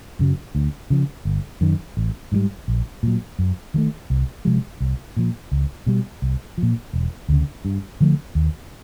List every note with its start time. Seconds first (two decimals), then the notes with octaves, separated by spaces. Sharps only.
0.19 F#2 C#3 F#3
0.55 D2
0.90 C#3 F3
1.25 G1
1.61 F#2 D#3
1.97 A1
2.32 G#2 E3 G3
2.68 A#1
3.03 A#2 F#3
3.39 F#2
3.74 D#3 F#3 A3
4.10 C2
4.45 C3 F3 G#3
4.80 C2
5.17 A#2 F3
5.52 C#2
5.87 B2 G3
6.22 C2
6.58 F3
6.63 A#2
6.93 E1
7.29 D2 C#3
7.65 G2
8.00 D3 F3 A3
8.35 D#2